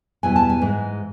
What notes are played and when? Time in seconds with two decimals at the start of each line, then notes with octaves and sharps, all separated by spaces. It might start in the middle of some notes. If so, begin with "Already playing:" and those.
0.23 E2 B2 G3 B3 E4 G#5
0.36 A5
0.50 G#5
0.61 G#2 E3 G#3